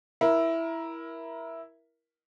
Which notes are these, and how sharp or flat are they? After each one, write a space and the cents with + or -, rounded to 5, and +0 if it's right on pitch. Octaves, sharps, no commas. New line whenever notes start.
E4 +0 A#4 +20